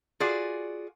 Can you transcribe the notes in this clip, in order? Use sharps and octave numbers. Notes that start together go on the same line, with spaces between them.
F4 F#4 G#4 D5